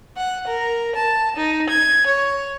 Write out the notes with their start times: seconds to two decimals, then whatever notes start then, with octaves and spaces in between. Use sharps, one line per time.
0.16 F#5
0.47 A#4
0.94 A5
1.35 D#4
1.68 G#6
2.06 C#5